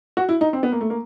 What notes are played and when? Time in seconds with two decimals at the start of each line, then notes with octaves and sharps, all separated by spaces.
0.17 F#4
0.29 E4
0.41 D#4
0.53 C4
0.63 B3
0.72 A#3
0.81 A3
0.90 A#3